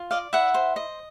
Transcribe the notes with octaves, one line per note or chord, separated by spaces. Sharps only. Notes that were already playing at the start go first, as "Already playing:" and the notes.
Already playing: F4
D5 D#5 F5
E4 E5 F#5
C5
D#5